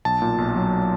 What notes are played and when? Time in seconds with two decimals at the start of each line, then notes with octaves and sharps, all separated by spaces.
0.05 B1 A5
0.22 A#2
0.38 B1
0.56 F#3